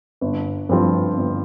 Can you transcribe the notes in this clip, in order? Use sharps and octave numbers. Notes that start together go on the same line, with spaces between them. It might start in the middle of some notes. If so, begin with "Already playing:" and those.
G1
G2 F3 C4 F4
G1